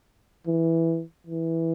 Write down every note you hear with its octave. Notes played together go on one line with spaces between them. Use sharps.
E3
E3